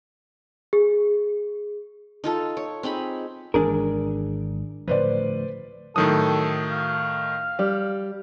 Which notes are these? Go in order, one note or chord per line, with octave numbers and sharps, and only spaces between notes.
G#4
D#4 F4 A4
C#5
C4 D#4 G#4 B5
G#1 E3 G#3 D4 G#4 A#4
A2 D3 F3 B4 C5 D5
A2 D#3 F#3 A4 D#6
F5
G3